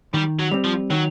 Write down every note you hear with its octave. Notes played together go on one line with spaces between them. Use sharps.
D#3 G3
F#3
G3 C4
F3
D#3 F#3